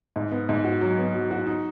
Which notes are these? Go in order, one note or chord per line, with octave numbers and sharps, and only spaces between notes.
G#2
B3
G#2
F#4
F#3
B3
F#3
F#4
D#4